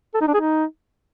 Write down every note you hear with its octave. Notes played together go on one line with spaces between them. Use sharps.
A4
D#4
D4
G#4
D#4